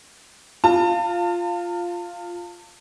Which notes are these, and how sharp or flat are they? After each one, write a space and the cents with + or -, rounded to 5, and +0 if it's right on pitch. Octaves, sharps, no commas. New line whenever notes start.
F4 +0 A5 +35